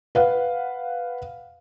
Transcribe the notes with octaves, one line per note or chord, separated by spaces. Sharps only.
B4 F5 F#5